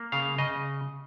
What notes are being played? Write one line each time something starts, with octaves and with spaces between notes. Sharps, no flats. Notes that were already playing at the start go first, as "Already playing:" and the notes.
Already playing: A#3
C#3 F5
C#3 D#5